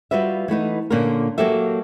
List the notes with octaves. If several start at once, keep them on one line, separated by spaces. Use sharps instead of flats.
G3 F4 F#4 B4 E5
E3 A3 B3 D#4
A#2 D3 A#3 C#4 F4 A#4
F#3 A#3 F#4 G4 A4 E5